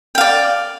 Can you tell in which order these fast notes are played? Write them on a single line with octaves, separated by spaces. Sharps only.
G5 F5 D5